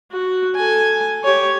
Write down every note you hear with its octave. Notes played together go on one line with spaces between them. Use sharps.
F#4
A4 G#5
G4 C#5